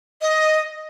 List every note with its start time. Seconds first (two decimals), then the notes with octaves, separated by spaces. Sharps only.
0.22 D#5